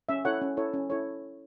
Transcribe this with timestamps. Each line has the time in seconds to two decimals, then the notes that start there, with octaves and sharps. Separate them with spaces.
0.09 C#4 E5
0.25 E4 A4 C#5 F#5
0.41 C#4
0.57 E4 A4 C#5
0.74 C#4
0.90 E4 A4 C#5